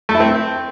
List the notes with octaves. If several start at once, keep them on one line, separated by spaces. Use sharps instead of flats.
A3
E4
C4